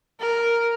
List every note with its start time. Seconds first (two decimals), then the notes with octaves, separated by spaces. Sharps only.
0.21 A#4